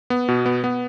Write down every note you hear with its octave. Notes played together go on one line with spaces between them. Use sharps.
B3
B2
B3
B3